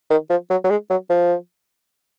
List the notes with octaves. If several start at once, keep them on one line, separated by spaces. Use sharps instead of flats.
D#3
F3
F#3
F#3
G#3
F#3
F3